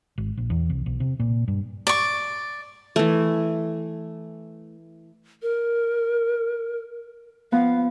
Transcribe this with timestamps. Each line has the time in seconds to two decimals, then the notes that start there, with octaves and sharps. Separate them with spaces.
0.18 G#1
0.37 A#1
0.50 E2
0.70 C2
0.86 B1
1.00 C3
1.20 A#2
1.48 G2
1.87 D5 C#6
2.96 E3 A3
5.42 A#4
7.52 F3 B3 F5